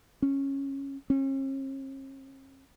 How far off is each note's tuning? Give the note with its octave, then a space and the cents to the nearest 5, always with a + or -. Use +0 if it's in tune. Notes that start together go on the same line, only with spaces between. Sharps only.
C#4 -10
C#4 -45